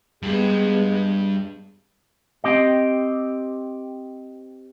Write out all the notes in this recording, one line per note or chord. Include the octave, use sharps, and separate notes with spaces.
G2 G#3 B3
C4 G4 D#5